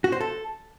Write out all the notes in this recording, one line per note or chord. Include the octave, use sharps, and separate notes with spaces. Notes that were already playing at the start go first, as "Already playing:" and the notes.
F#4
C5
A4